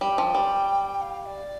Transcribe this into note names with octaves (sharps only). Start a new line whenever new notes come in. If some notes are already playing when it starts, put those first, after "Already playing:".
G3 G5
F3
G3
F5
D5